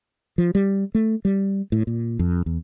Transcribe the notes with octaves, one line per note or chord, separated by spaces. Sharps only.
F3
G3
A3
G3
A2
A#2
F2
E2